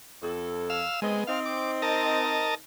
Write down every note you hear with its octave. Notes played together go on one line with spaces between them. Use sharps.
F2 A4
F5 E6
G#3 B3 C4 D#5
C4 D#4 F5
D6
A#4 D#5 A5